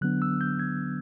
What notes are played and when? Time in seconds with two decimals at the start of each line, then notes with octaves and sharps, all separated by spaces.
0.01 D3 F#3 B3 D4 F#6
0.22 E6
0.41 G6
0.59 G#6